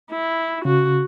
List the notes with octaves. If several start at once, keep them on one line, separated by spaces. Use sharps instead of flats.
E4
C#3 F#4